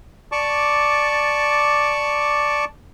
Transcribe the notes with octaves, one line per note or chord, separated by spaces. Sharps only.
D5 A5 C#6 D6